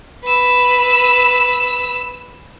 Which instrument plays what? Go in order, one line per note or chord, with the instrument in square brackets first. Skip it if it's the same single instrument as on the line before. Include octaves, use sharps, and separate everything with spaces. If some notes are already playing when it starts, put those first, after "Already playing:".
[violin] B4 E6